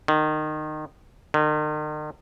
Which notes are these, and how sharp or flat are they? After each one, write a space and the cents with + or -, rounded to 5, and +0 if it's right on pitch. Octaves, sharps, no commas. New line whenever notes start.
D#3 -20
D#3 -40